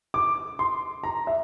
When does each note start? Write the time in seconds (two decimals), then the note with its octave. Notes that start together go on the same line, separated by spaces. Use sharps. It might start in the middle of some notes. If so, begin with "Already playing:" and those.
0.14 D6
0.59 C6
1.04 A#5
1.27 E5